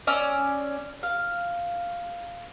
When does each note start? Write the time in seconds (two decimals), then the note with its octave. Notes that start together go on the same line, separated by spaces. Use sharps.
0.07 C#4 D5 E6
1.03 F5